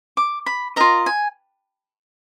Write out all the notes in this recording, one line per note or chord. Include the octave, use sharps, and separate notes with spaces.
D6
B5
F4 A#4 D#5 A#5
G#5